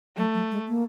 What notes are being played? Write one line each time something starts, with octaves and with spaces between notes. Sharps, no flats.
F#3 A3
F#3
G#3
A#3